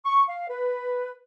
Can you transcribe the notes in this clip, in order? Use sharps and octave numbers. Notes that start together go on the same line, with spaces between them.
C#6
F5
B4